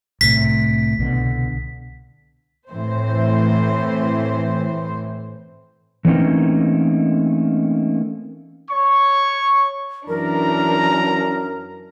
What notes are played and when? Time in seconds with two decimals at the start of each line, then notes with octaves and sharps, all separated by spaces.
0.21 C2 A2 C3 B6
0.98 C2 B2 D3
2.70 A2 E3 C4 C5
6.05 E3 A3 A#3 C4 C#4 D#4
8.69 C#5 C#6
10.08 F#2 E3 D4 A#4 A#5